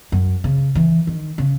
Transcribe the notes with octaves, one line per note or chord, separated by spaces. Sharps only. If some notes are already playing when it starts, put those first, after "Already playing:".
F#2
C#3
E3
D#3
C#3